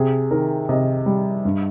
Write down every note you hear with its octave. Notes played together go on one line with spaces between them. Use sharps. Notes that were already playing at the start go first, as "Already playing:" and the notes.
Already playing: C3 G#4
D#3 A#4
C3 D#5
G3
G2